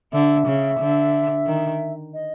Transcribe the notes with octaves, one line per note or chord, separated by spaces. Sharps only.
D3 E5
C#3
D3
D#3
D#5